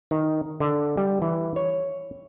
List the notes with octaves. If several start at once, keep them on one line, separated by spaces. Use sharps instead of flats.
D#3
D3
G3
E3
C#5